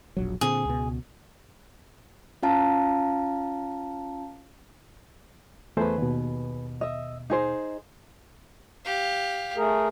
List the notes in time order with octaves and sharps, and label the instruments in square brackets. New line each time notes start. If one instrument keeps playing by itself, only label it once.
[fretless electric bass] E1 A#1 F#3
[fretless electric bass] A#2 D3 C4 [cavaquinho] G#4
[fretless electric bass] C#2 B2
[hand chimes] C#4 F4 F5 A5 A#5
[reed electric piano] E2 A3 C5 [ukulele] G#4 B4
[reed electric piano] D#2 B2
[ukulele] D#5 E5
D#4 G#4 C5
[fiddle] G4 F5
[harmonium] A3 G#4 A#4